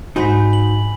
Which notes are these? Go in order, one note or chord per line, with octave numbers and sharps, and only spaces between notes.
G#2 D3 D#4 F#4 C5 G#5 B5 B6
F#7